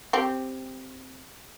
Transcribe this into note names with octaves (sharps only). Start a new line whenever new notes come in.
C4 G4